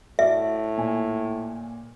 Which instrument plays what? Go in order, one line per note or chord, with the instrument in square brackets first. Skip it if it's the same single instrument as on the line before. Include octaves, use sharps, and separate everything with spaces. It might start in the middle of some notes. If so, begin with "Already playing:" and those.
[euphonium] A2 [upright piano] F#4 D5 [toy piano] E5
[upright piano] A#2 G#5